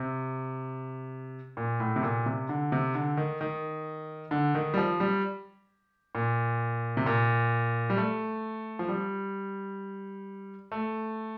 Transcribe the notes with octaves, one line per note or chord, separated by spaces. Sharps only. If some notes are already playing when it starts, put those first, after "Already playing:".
Already playing: C3
A#2
A2
C3
A#2
C3
D3
C3
D3
D#3
D#3
D3
D#3
G3
F3
G3
A#2
C3
A#2
G3
A3
F3
G3
A3